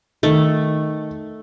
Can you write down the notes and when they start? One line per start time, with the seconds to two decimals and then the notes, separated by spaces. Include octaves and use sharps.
0.23 D#3 A3